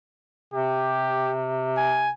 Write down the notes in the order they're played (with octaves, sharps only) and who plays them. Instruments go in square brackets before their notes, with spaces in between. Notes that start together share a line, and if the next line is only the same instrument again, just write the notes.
[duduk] C3 [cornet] G4
[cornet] G#5